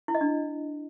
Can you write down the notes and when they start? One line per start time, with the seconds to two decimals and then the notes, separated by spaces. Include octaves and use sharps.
0.08 E4
0.15 D#5
0.21 D4